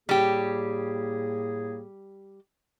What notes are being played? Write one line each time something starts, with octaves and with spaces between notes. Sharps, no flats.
A2 G3 A#3 G4 G#4